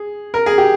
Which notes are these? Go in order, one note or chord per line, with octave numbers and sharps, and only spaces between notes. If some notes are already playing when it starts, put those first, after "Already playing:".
Already playing: G#4
A#4
G#4
G4